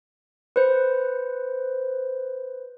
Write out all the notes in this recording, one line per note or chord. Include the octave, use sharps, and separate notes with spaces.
B4 C5